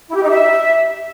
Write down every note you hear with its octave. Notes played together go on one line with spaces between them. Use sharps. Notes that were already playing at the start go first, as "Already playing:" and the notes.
E4
G4
D#4
E5